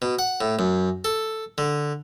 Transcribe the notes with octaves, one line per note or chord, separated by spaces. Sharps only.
B2
F#5
A2
F#2
A4
D3